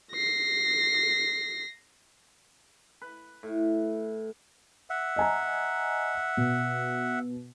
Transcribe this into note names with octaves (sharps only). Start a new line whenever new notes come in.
A#6 C7
B4
A2
E5 F#5
D#5 G#5 A#5
B2